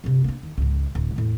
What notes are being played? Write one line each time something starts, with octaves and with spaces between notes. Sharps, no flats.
G2 C3
A#3 D4
D#2
C#2 G#2
D1
E2 A2